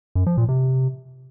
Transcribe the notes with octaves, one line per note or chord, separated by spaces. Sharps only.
F#2
F3
A#2
C3